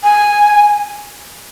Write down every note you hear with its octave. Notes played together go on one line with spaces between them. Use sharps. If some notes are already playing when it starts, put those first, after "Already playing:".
G#5